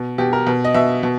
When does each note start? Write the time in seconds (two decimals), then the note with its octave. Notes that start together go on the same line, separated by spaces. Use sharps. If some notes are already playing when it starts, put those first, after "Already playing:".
Already playing: B2
0.18 B2 G4
0.33 A#4
0.47 B2
0.64 D#5
0.74 B2 E5
1.03 B2